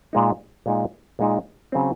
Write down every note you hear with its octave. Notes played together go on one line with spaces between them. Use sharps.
A#2 G#3 D#4
A#2 G#3 D#4
A#2 G#3 D#4
C#3 F#3 C4